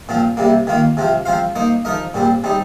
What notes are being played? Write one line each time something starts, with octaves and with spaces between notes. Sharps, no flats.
A#2 F3 C4 F4
C3 G3 A#3
D#3 A#3 F4
C3 F3 C4 F4
F3 C4 F4 C5 F5
A#3 D#4 C5
F3 D#4 A#4 D#5
A#2 G3 C4
G3 C4 D#4